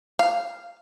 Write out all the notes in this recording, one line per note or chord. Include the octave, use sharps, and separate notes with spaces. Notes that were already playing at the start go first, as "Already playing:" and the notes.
F5